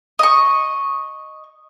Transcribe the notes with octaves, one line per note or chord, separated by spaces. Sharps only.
D#5 C#6